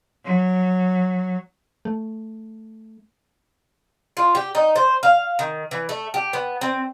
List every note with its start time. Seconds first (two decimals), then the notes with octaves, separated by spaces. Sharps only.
0.24 F#3
1.85 A3
4.17 F4
4.35 G4
4.55 D#4
4.76 C5
5.03 F5
5.39 D#3
5.71 E3
5.89 A3
6.14 G4
6.33 B3
6.61 C4